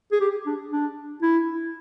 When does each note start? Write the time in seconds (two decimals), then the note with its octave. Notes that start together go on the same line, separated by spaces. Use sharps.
0.12 G#4
0.21 G4
0.46 D4
0.71 D4
1.22 E4